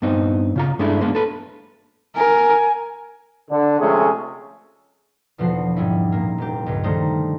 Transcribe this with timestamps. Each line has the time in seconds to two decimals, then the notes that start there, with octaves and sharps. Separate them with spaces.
0.02 G2 B3 C4 D#4
0.56 C#3 F4 A#5
0.79 G2 G#3 A3 C#4 D4 E4
1.01 G#3 A#3 B3 C#4 D4
1.15 A4 B4
2.16 A#4 G#5
3.50 D3
3.79 C3 F3 G#3 A3 C#4 G#4
5.38 E2 B2 D3 F3 F#4 C7
5.76 G#2 G3 C#4 E4
6.12 A#2 A#3
6.38 F1 G4
6.66 C#2 G2
6.83 D3 D#3 G3 A3 D#4 C5